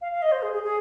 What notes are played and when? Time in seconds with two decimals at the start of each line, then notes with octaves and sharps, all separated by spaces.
0.01 F5
0.12 F5
0.22 D#5
0.32 C5
0.43 G#4
0.53 G#4
0.63 G#4